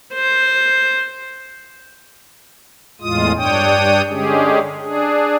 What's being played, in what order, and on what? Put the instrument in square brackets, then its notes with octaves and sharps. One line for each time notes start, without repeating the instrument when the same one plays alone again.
[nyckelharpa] C5
[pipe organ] E2 A2 G#3 F4 D#6
G2 D4 C#5 G5 D#6
D3 G#3 C#4 G4 G#4
D4 G#4